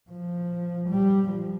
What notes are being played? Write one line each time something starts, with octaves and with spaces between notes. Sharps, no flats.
F3
G3
F3